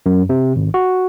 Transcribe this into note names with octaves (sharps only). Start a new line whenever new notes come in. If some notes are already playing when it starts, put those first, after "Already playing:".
F#2
C3
G#1
F#4